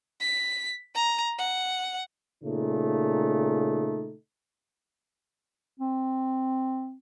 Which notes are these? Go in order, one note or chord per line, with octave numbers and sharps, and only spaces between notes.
B6
A#5
F#5
A#2 C#3 A3 D#4
C4